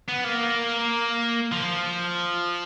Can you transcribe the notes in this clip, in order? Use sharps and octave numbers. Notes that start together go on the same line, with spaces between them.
B3
A#3
F3